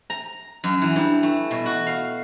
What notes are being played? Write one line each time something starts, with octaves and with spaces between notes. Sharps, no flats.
A#5
F#2
E3
G2
A3
B2
F#4
F5